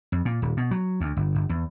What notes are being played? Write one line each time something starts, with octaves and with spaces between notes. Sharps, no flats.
F2
A#2
D#1
B2
F#3
D2
G1
G1
E2